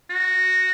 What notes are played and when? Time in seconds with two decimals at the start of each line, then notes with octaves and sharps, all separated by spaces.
0.10 F#4